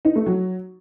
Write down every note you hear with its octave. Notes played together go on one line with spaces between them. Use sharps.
D#4
A3
F#3